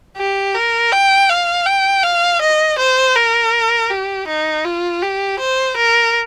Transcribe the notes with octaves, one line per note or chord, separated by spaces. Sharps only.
G4
A#4
G5
F5
G5
F5
D#5
C5
A#4
G4
D#4
F4
G4
C5
A#4